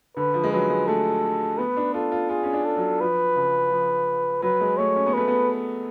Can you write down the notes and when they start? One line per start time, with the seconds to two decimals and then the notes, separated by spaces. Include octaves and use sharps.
0.17 D3 B4
0.34 F3
0.44 G#3
0.52 F#3 B4
0.70 G#3
0.87 A3 A4
1.58 B3 B4
1.77 D4
1.94 F4 A4
2.12 F4
2.29 F4 G#4
2.43 C#4
2.53 D4
2.65 A4
2.77 F#3
3.00 F3 B4
3.36 C#3
3.71 F3
4.42 F#3 B4
4.61 G#3
4.77 A3 C#5
4.96 C#4
5.06 B3
5.14 A3 B4
5.28 B3